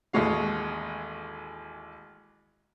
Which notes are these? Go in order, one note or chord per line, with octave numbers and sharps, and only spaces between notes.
A1 D#2 G#3 F#4 F5